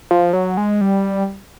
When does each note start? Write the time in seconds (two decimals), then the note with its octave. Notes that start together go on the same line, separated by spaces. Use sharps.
0.11 F3
0.33 F#3
0.57 G#3
0.81 G3